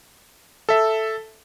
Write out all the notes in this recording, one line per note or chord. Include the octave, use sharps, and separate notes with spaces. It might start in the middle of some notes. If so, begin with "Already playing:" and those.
A4 E5